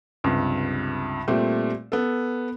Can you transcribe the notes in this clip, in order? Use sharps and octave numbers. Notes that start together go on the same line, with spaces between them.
C#2 G2 C3
A#2 G3 A3 C4
B3 A4